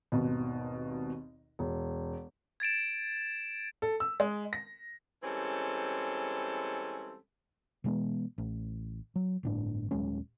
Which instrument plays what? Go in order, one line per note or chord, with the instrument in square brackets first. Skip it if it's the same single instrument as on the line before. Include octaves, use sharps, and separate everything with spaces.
[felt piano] G#1 D#2 B2
E1
[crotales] G#6 A6 D7 E7
[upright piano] A4
E6
G#3
A#6
[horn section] E3 G3 G#3 C4 C#4 A4
[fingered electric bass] B2 E3 G#3 B3
A1
F#3
G1 A2 D4
D#1 F#3 G#3 C#4